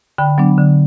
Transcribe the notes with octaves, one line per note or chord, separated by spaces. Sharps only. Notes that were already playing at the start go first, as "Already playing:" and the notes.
D3 G5 B5
F#3 B3 D4
D3